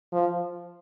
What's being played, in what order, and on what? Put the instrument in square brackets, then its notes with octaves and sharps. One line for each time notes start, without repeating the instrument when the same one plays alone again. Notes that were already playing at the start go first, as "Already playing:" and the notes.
[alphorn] F3